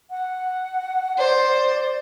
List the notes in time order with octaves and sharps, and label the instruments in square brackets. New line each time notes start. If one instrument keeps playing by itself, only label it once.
[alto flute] F#5
[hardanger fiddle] C5 [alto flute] D5